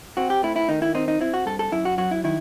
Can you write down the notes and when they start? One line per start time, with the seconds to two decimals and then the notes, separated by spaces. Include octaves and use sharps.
0.17 C4 F#4
0.30 G4
0.43 A3 E4
0.56 E4
0.69 D#3 D#4
0.82 E4
0.95 C4 D#4
1.08 D#4
1.21 C4 E4
1.34 F#4
1.46 G2 A4
1.59 A4
1.72 F#2 E4
1.85 F#4
1.98 F#3 F#4
2.11 E4
2.24 D#3 E4